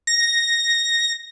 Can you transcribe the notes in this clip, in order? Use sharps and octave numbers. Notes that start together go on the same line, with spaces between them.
A#6